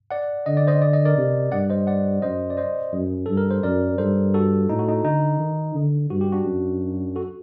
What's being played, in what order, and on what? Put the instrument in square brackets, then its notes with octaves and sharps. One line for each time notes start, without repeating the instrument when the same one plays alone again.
[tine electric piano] D5 F#5
[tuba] D3 [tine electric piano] D#5
[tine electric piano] D5
C5 D#5
D5
D#5
A#4 D5
[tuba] C3
[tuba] G2 [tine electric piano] D5 F#5
[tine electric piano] C5 D#5
D5 F#5
[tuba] F#2 [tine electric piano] C5 D#5
[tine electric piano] D5
C5 D#5
[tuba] F#2
[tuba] G2 [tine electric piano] A4
[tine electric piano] A#4
C5
[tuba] F#2 [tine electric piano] A#4 D5
[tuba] G2 [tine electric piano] A4 C5
[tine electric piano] F#4 A4
[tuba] A2 [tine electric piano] D#4
[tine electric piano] F#4
D#4
[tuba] D3 [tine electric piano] D#4
[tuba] D#3
D3
[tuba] G2 [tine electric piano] F#4
[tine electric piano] G4
D4 F#4
[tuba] F#2
[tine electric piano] F#4 A4